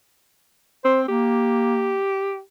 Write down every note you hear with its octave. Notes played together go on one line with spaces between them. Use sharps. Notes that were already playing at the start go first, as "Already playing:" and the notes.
C4 C5
A#3 G4